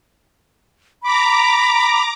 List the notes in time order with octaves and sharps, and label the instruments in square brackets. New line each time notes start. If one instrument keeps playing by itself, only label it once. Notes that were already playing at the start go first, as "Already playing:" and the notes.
[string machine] A#5 D6 [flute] B5